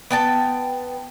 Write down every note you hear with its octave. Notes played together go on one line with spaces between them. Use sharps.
B3 G5 A5